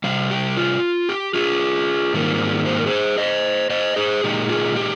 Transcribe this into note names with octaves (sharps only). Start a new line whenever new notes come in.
C3 G3 F5
G4
F4
G4
F4 G#4
G#2 D#3 G3 A#3
C5
A#4
G#4 C5
C5 D#5
C5 D#5
G#4 C5
A#2 G#3 D#4 G4
F4 G#4
G4